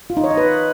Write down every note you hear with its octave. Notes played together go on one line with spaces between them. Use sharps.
F4
D#4
C#5
D#5
B4